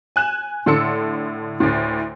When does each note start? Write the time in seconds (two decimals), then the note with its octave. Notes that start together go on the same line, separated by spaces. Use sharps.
0.16 G#5 F#6 E7
0.66 A2 D3 A4 C6 E6 C#7
1.60 D2 A2